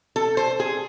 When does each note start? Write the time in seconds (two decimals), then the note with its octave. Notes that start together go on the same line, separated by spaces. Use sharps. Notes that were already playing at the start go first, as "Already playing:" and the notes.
0.16 A4
0.37 C5
0.60 G#4